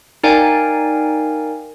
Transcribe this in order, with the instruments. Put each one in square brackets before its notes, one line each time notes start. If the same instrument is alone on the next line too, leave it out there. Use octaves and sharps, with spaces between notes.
[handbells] D#4 A#4 D5 F5 G5 G#5